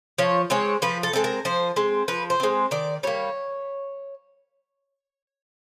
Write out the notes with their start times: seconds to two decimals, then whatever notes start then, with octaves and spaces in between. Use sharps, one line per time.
0.18 F3 C#5
0.50 G#3 C4 C#5
0.82 F3 B4
1.03 A4
1.13 G#3 C4 A4
1.24 A#4
1.45 F3 C5
1.76 G#3 C4
2.08 F3 B4
2.30 C5
2.40 G#3 C4
2.71 D#3 D5
3.03 G3 A#3 C#5